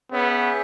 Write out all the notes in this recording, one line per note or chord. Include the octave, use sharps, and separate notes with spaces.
B3 C#4 G#4 C#5 E5 G5